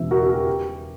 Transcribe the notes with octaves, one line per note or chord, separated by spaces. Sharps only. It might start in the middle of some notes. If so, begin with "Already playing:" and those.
Already playing: E1 E2 C#3 E3 E5
F#4 A#4
F#4
A#4
G4
G4